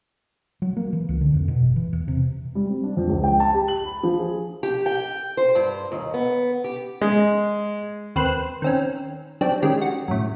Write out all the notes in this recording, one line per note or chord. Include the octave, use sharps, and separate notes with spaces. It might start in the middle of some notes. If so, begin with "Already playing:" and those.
F#3
A#3
E3
C#2
D3
F2
B2
G1
E3
E2
C3
G3
C4
D4
F2
C#2
G5
A5
G4
F#7
B5
F3
G#4
G4
G5
C5
G2
D#2
B3
G4
G#3
D#2 C4 B4 C6 F#6 E7
D#3 C4 C#4
F#3 C4 D4 G4
D#3 G#3 C#4 G4
F#4
F#2 A2